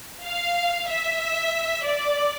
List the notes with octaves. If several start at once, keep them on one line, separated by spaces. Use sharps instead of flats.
F5
E5
D5